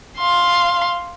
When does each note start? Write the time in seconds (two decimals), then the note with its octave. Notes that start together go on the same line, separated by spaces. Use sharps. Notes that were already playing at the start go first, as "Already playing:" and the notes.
0.18 F5 C6